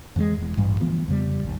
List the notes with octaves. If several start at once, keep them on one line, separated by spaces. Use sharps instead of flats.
F2 E3 G3 G#3
E1 E2
A1 G2 G3
D2 E3 F3 B3
F2 C#3 G3
A#1 D#2